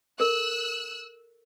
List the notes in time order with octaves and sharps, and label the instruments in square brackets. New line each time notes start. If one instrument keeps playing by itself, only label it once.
[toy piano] A4 A#4 [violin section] E6 F#6